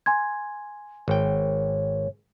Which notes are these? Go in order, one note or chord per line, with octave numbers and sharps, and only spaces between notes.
G#5 C6 G#6
G#1 C#5 G5